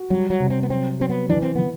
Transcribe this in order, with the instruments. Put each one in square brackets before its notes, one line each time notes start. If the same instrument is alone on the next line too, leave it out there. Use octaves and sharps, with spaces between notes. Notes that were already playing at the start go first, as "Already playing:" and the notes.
Already playing: [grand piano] F#4
[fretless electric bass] F#3 [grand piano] G3
[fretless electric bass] F#3
[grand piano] C3
[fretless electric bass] C4
B3
[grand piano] F#3 [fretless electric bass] C4
[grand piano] F#3 [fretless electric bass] C4
[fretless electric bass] B3
[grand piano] E3 [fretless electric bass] D4
[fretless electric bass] C4
[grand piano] E3 [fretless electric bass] B3